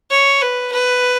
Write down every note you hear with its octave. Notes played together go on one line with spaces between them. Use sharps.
C#5
B4
B4